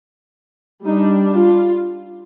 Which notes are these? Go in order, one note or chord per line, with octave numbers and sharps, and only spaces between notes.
G3 D4 D#4
F4